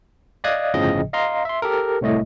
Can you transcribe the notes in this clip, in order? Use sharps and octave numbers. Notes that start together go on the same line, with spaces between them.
D5 D#5 F5 D#6 F#6 G#6
G1 A2 C#3 F3 D#5 G5
D#5 F5 A#5 C6
E5 C6
G4 A4 A#4
C2 A2 A3 D#5